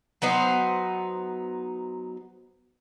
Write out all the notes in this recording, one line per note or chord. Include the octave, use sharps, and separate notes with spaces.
F#3 B3 D#4 C5